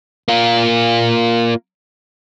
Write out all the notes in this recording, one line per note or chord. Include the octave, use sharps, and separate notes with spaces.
A#3 F4